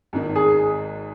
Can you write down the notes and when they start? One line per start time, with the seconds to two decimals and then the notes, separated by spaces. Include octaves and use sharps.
0.13 G#1 G#2 D#3
0.36 G#4